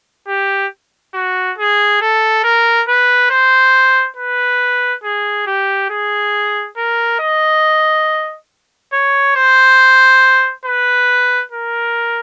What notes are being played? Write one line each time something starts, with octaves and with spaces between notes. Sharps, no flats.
G4
F#4
G#4
A4
A#4
B4
C5
B4
G#4
G4
G#4
A#4
D#5
C#5
C5
B4
A#4